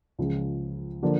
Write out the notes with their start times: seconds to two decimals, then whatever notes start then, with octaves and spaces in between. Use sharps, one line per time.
0.19 C#2 C#3 F3 G#3
1.03 D3 F3 A#3 D4